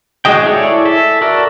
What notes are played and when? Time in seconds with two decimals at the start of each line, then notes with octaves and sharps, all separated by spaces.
0.25 G#3 F#4 G#4 D#5 G5
0.45 E4 G#4 A4 C#5 D5
0.85 A4 E5
1.21 F#4 A4 A#4 D5